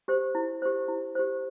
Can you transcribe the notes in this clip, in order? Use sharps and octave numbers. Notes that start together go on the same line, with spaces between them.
G4 C5
E4
G4 C5
E4
G4 C5